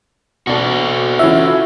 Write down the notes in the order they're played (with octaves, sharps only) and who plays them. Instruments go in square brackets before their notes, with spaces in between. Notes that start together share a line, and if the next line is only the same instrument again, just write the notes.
[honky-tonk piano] B2 D4 [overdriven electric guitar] F#4 A4
[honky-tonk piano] E3 C#4 F4 [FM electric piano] E5